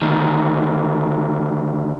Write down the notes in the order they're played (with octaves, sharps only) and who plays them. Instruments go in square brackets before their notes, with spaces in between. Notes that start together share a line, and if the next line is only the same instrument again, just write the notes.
[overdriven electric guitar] D2 D#3